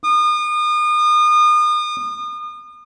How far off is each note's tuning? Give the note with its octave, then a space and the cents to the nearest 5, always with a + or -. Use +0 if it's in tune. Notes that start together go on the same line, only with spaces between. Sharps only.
D#6 -35